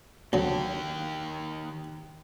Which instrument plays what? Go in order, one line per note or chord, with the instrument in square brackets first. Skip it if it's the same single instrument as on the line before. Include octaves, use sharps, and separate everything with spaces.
[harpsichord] D2 F#3 [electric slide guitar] D#3 G4